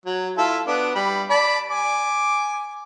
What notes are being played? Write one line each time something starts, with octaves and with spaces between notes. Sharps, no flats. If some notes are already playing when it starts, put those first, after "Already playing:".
F#3
E4 F4 A4
B3 D4
G3 B5
D5 A5 B5
G#5 D6